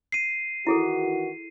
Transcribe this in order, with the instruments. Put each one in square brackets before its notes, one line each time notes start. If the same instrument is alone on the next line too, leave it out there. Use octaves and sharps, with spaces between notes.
[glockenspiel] C7 D#7
[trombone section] D#3 E3 F#4 [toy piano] E4 G#4 A4